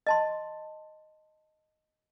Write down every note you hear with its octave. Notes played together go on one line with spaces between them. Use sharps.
D#5 A5 C6